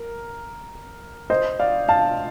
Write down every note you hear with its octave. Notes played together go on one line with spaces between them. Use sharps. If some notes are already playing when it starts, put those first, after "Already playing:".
Already playing: A#4
C5 D#5
D5 F5
F5 A5